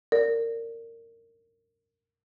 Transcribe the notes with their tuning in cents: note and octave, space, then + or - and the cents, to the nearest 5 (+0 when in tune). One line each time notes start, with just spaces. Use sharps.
A#4 -20 D5 -20